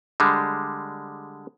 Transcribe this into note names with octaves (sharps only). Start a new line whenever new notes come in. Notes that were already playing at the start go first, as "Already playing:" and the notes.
D3 G3 G#3